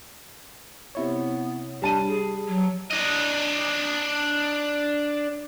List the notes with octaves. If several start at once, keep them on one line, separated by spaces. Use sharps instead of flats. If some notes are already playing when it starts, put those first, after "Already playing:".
C3 B3 E4 C#5
G3 D4 A5 D#7
G#4
F#3
D4 D#5